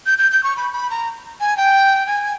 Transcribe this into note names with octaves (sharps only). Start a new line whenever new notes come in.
G6
G6
G6
C#6
B5
B5
A#5
G#5
G5
G#5